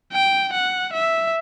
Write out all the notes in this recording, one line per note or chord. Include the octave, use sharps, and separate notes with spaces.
G5
F#5
E5